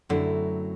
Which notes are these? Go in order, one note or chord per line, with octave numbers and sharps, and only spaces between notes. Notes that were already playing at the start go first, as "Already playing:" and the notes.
F#2 D3 F#3 A3 C4 E4